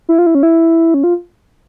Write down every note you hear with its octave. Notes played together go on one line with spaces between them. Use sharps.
E4
F4
E4
C#4
E4
C#4
F4